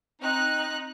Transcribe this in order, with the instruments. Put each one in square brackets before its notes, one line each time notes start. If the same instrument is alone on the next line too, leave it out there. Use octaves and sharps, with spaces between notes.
[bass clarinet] C4 [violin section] D#4 F#6